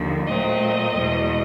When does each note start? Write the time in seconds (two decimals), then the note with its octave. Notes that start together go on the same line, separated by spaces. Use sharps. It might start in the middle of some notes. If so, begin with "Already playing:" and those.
Already playing: D#2 D3 F3
0.27 A#2 F#3 A3 C4 D#5
0.97 E2 B2 G#3